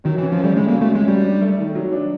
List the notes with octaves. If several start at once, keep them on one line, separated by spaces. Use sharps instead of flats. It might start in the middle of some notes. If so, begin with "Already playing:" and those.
D#3 F#3
E3
C#4
F3
G3 A3
C#3 G#3
A#3
F#3
A3
G#3 C#4
F#3 G3
D4
A3
D#3
F#3
D4